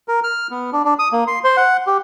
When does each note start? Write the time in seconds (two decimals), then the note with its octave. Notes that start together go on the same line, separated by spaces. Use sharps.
0.08 A#4
0.24 F6
0.51 B3
0.73 D4
0.85 D4
0.99 D#6
1.13 A#3
1.27 C6
1.44 C5
1.57 F#5
1.87 G4